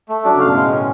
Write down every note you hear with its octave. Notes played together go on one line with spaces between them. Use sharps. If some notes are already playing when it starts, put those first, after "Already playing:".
A3
F#3 D4
C#3
F5
B2
A2 G#3
C#4